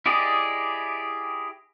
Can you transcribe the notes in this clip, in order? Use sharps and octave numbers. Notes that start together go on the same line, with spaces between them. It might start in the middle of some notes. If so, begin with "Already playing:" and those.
E4 G4 G#4 D5 D#5